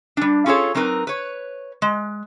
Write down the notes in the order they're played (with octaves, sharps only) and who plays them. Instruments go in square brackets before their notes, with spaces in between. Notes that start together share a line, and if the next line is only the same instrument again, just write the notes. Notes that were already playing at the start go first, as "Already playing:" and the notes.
[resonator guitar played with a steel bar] G3 D4
C#4 F4 G#4 A4 C#5
F#3 C4 D#4 A#4 B4
B4 C#5
G#3